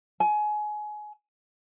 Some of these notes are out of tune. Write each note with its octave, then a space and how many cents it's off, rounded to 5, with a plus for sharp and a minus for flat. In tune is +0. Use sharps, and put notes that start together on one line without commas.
G#5 +25